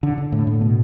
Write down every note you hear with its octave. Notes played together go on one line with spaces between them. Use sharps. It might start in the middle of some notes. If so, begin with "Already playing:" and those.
D3
D3
A2
A2
B2